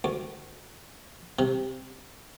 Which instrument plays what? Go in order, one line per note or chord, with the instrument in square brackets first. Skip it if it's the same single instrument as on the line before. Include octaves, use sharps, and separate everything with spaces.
[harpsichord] D2
C3